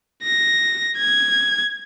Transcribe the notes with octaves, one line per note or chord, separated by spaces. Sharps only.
A#6
G#6